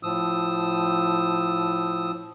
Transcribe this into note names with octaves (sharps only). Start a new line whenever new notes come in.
A2 F3 D#6 E6